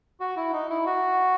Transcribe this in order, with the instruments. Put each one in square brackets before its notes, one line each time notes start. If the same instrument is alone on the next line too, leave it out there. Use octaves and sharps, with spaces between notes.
[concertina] F#4
E4
D#4
E4
F#4